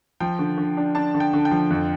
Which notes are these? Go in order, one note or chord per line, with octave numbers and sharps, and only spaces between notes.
F3 G5
D3
D3
D4
D4 A5
D3
G5
D3
G5
F3
F2